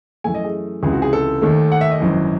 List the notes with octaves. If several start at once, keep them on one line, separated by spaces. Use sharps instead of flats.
F#2 E3 A3 G#5
D#5
G#4
C#2 C3 E3 G#4
F#4
G#4
A4
D#2 D#3 A3
F#5
E5
D#5
G#1 F#2 E3